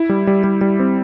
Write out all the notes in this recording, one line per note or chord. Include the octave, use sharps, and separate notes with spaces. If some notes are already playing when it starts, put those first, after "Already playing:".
Already playing: E4
G3
G3
G3
G3
C4